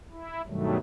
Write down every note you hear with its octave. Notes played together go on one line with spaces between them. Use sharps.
E4
G2 B2 D#3 F#3 G3 A3